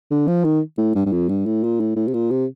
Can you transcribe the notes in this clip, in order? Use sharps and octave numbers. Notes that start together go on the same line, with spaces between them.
D3
F3
D#3
A2
G2
G2
F2
G2
A2
A#2
A2
A2
C3
A#2
C3